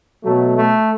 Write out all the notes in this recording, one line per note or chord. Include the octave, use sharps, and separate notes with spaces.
B2 F#3 A3
A3